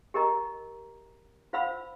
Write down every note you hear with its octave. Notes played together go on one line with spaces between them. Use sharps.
G4 A#4 D#5 A#5
F4 C5 F5 F#5 B5 E6